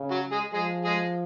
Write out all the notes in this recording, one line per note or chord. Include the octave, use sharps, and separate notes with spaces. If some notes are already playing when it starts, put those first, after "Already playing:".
Already playing: C#3
F#3 F#4
G#3 G#4
F3 G#3 G#4
G#3 G#4